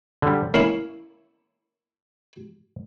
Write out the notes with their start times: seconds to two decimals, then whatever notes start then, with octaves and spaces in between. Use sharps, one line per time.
0.22 D3 G3
0.54 A#3 C#4 E4 F5